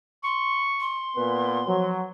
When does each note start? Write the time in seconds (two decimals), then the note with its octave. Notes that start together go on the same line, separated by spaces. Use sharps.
0.24 C6 C#6
0.81 C6
1.16 A#2 B3 B4
1.67 F3 F#3